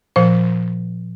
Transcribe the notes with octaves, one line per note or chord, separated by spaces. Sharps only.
A#2 F3 C5